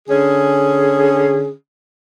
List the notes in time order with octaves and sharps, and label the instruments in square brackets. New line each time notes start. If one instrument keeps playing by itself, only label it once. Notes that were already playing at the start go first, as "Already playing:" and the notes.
[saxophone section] D3 C#4 G#4